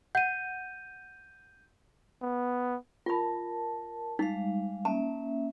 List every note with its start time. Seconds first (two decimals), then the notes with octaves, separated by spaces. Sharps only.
0.15 F#5 G6 D#7
2.22 B3
3.06 F4 A#4 A5 B5
4.19 G3 G#3 D#4 F5
4.85 A#3 C#4 E5 A5